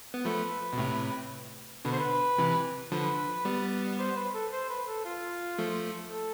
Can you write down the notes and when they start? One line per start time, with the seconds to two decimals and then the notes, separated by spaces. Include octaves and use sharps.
0.14 B3
0.25 F3 A3 B4
0.73 B2
0.78 A2 C3
1.85 B2 D3 B4
1.92 C5
1.99 B4
2.38 C3 E3
2.92 D3 F3 B4
3.45 G3 B3
3.99 C5
4.16 B4
4.34 A4
4.52 C5
4.69 B4
4.87 A4
5.05 F4
5.58 F3 A3
6.12 A4